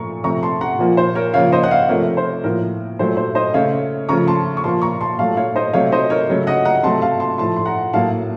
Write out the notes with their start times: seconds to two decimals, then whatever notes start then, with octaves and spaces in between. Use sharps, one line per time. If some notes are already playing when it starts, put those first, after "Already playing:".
Already playing: A#2 F3 A3 A#5 C#6
0.24 C3 F3 A3 A#5 C#6
0.43 A5 C6
0.61 F#5 A#5
0.79 A#2 F3 A#3
0.97 C5
1.15 A#4 C#5
1.34 C#3 F3 A#3 C#5 F5
1.52 C5 D#5
1.63 F#5
1.71 C#5 F5
1.89 C3 F3 A3 A#4 C#5
2.17 C5
2.44 A2 F3 A#3 A#4
2.99 A#2 F#3 A3 C5
3.17 C5
3.35 C5 D#5
3.54 C#3 A3 C#5 F5
4.09 C#3 F3 A3 A#5 C#6
4.27 A5 C6
4.57 C#6
4.64 A#2 F3 A#3 A5 C6
4.82 A#5 C#6
5.01 A5 C6
5.19 A#2 F#3 A3 F5 A5
5.37 C#5 F5
5.56 C5 D#5
5.73 C3 F#3 A3 C#5 F5
5.92 C5 D#5
6.10 A#4 C#5
6.29 C#3 F#3 A3
6.47 D#5 F#5
6.65 F#5 A#5
6.83 C3 F#3 A3 A5 C6
7.02 F5 A5
7.20 A5 C6
7.38 A2 F3 A3 A5 C6
7.56 C6
7.66 F#5 A#5
7.93 A2 F#3 A#3 F5 A5